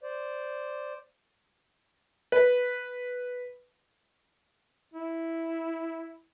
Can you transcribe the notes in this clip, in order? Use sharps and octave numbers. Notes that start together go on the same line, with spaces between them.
C5 D5
B4
E4